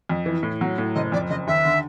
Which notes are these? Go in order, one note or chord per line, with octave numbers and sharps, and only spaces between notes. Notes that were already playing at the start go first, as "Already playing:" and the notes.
F2
E3
A2
F#3
A2
F#1 D#5
F2 D5
F#1 D#5
D#2 E5
D3